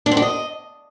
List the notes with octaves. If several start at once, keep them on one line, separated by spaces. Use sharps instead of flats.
D4
C4
D4
D#5